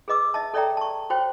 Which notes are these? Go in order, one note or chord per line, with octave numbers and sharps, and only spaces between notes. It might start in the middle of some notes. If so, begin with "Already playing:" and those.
G#4 B4 D#5 D6 E6
D#5 E5 A5
A4 C#5 D5 E5 G5 A#5
A5 C#6
F#4 C5 C#5 G5